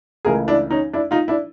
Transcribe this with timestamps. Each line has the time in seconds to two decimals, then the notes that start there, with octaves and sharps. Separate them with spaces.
0.25 C#2 C#3 E3 A3 G#4 A#4
0.48 D4 E4
0.71 C#4 D#4
0.93 D4 E4
1.11 D#4 F4
1.28 D4 E4